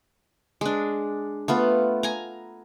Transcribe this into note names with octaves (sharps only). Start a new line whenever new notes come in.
G#3 D4
A3 B3 F4
G#5 A#5